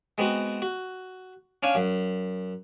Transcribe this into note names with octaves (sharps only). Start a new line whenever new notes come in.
G#3 B3 C4 F#4
F#4
C#4 D4 F5 G#5 C#6
F#2